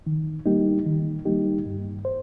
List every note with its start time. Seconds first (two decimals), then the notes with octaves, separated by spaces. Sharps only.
0.07 D#3
0.46 G3 A#3 D#4 G4
0.86 D#3
1.25 G3 A#3 D#4 G4
1.66 G2
2.05 C5